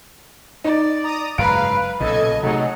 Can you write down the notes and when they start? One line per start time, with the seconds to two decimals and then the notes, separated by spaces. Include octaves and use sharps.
0.64 D#4 D5
1.04 A#5 D#6
1.38 F#1 G#2 F#3 B4 F5 A#5 B5 D7
2.00 B1 A#2 C#3 A4 D#5 G#6
2.43 C3 F#3 A3 D#4 G#4 A4